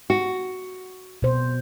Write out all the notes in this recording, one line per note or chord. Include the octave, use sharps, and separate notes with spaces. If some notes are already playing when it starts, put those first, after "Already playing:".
F#4
B2 C5